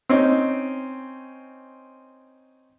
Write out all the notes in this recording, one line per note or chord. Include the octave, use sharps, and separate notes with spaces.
C4 C#4 D#4